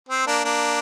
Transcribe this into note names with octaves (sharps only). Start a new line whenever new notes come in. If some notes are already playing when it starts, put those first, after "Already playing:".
C4
A#3 D4
A#3 D4